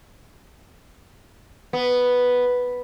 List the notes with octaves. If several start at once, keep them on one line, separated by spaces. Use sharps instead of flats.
B3